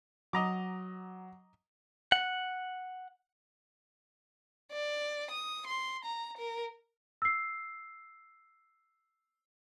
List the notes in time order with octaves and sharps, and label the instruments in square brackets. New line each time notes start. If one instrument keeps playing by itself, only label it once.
[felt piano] F#3 [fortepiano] D#5 A#5 D6
[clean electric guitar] F#5
[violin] D5
D#6
C6
A#5
A#4
[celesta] E6 C7